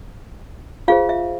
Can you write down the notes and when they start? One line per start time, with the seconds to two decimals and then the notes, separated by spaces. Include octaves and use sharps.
0.88 F4 G#4 C5 F5
1.09 E5